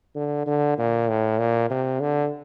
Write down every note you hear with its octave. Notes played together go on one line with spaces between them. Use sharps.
D3
D3
A#2
A2
A#2
C3
D3